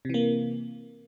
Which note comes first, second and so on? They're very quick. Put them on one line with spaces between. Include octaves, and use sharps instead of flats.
C3 E3 A#3